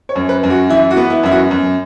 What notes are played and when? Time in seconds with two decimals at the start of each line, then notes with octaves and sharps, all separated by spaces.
0.09 C#5
0.16 F#2
0.29 B4
0.43 F#2
0.50 F#4
0.69 E3 E4
0.91 F#4
0.97 B3
1.10 E4
1.23 F#2 E4
1.31 F#4
1.51 F#2